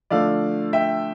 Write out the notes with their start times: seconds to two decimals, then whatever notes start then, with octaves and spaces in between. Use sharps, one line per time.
0.10 D3 F3 A3 D5 F5
0.73 E5 G5